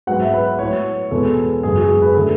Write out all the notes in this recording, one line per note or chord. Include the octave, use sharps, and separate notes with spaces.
G#2 F#3 B3 F#5
E5
B4
A2 F#3 B3 C#5
E2 B2 G#3 B3 A4
F#2 C#3 G#3 B3 G#4
F#4
G#4
B4
D3 A3 A4